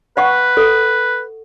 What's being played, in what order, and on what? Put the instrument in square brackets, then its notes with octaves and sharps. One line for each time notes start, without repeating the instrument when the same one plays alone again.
[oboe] B4 [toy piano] F5 F#5 C#6
[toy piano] A4